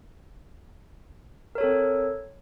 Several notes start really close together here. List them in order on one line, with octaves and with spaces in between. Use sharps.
A#4 C#5 A4 C4